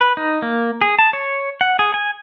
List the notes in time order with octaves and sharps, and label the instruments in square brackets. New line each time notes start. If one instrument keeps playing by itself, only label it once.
[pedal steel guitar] B4
D#4
A#3
G#4
A5
C#5
F#5
G#4
G#5